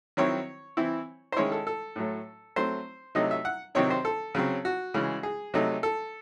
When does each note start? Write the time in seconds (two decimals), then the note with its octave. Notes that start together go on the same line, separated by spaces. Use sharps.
0.17 D#3 F#3 C4 E4 C#5
0.77 E3 C4 E4
1.32 C5
1.36 D#3 G#3 C#4 E4 C#5
1.52 A4
1.67 A4
1.96 A2 F#3 A3
2.56 F#3 A3 C4 C5
3.15 C3 F#3 A3 D#4 D#5
3.31 E5
3.45 F#5
3.75 C3 D#3 F#3 C4 D#4 C#5
3.90 C5
4.05 A4
4.35 C#3 F#3 C4
4.65 F#4
4.94 C#3 E3 G#3
5.23 G#4
5.54 C3 F#3 A3 D#4
5.83 A4